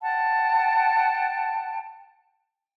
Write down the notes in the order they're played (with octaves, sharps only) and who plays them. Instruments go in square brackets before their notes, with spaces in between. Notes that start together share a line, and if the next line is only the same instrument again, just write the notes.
[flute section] F#5 G5 A5